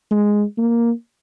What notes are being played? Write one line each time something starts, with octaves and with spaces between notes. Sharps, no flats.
G#3
A#3